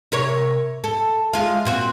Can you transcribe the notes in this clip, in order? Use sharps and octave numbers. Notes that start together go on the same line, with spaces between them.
C3 A#4 C#5
A4
G#3 F4 F5
A#2 C4 F#4